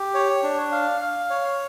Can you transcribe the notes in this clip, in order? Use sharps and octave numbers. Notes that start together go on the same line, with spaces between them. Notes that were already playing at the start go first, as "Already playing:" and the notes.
Already playing: G4
C#5
D4
F5
F5
C#5